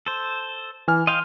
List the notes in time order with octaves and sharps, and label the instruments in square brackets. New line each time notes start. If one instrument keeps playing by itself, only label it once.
[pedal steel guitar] A4 C5
[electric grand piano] E3 G#5 F6
[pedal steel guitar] D#5 F5 G5 [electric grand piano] C6